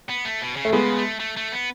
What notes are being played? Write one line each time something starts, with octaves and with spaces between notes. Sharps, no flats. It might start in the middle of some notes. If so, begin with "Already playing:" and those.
B3
A3
B2
C#3
A3
C#3 G#3 B3
A3
A3
A3
B3